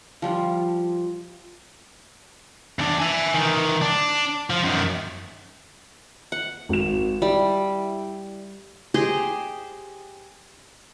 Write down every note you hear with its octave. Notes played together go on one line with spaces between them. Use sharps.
F3 G3 F4
E2 D4
E5 G#5
D#3 E3
D4
F3
F#2 D#3
F#5
G#1 E7
G3 E4
G4 G#4 C5 D#5